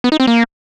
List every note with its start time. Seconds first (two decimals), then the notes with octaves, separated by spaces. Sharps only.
0.04 B3
0.12 D#4
0.20 C4
0.27 A#3